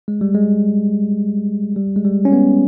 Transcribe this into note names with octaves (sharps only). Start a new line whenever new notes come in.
G#3
G3
G#3
G3
G#3
G3
C#4
B3